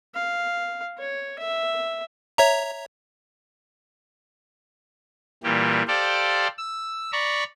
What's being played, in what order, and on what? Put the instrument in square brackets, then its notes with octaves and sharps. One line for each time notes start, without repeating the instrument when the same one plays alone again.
[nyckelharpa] F5
C#5
E5
[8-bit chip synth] C#5 E5 A#5
[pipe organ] A#2 E3 G3 G4
G4 A4 C5 D5 F5 G5
E6
D5 A#5 B5 C#6